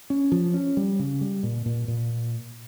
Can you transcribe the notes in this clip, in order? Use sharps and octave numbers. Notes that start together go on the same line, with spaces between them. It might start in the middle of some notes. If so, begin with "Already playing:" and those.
C#4
F3
C#4
G3
C#3
G3
A#2
A#2
A#2